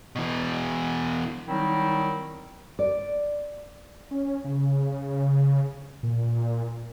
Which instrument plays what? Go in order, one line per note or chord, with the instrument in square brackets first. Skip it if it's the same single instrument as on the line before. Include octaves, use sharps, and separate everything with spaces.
[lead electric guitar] B2 E3
[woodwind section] D#3 F#3 G3 C4 D#4 E4
[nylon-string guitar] D5
[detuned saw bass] C#4
C#3
A#2